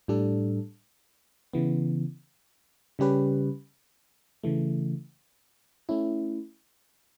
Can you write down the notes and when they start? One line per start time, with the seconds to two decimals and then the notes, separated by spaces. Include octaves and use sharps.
0.08 A2 G3 D4 A4
1.53 C#3 E3 B3
2.99 C#3 G3 C#4 G4 B4
4.43 C#3 E3 A3
5.89 A3 C#4 E4